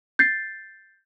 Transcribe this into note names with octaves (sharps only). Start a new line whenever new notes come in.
G6 A6 C7